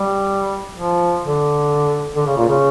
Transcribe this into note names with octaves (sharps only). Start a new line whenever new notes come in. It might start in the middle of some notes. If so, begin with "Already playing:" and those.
Already playing: G3
F3
D3
D3
C#3
A#2
C#3